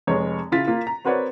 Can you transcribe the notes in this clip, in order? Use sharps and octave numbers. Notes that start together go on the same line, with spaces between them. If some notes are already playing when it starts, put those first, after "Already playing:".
F1 G#3 C#5
C#3 E4 F4 A6 B6
A#3 F4
A#5
C4 F#4 A#4 B4 C#5 D5